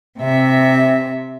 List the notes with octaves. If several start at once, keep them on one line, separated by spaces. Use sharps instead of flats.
C3 E5